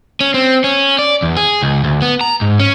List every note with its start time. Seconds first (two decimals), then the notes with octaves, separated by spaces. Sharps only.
0.21 C#4
0.34 C4
0.64 C#4
0.99 D5
1.22 E2
1.37 G#4
1.63 C#2
1.84 D2
2.02 B3
2.21 A#5
2.41 G#2
2.59 C#4